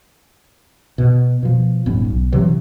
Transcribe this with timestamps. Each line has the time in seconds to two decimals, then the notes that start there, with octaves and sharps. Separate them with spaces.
0.98 B2
1.43 B2 F3
1.86 D#1 G#2 B3 C#4
2.10 B1
2.32 D#1 C3 E3 F#3